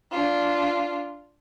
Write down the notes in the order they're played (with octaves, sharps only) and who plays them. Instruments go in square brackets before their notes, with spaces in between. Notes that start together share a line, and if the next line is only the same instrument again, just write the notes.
[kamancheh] D4 F4